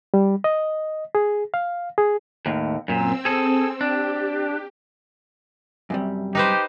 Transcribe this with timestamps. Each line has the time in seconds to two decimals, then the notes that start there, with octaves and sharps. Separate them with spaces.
0.14 G3
0.44 D#5
1.15 G#4
1.54 F5
1.98 G#4
2.46 D#2 A2
2.88 F#2 A#2 C4 E6
3.25 G#4 A4
3.81 D4 G4
5.90 F#2 C3 G3
6.35 D#4 G4 B4 C5